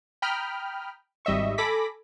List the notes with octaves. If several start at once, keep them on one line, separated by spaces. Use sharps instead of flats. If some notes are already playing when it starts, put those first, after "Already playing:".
G5 A#5 B5 D#6 F6
G#1 G3 D#5 E5 C#6
A4 G#5 B5 D6 A#6 B6